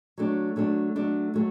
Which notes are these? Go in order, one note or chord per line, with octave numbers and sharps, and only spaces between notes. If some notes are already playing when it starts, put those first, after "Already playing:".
F#3 A3 D4
F#3 A3 D4
F#3 A3 D4
F#3 A3